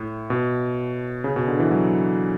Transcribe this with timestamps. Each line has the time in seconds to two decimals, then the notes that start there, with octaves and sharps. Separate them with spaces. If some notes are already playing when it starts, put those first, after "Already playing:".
Already playing: A2
0.30 B2
1.24 C#3
1.36 B2
1.48 D3
1.60 E3
1.71 F#3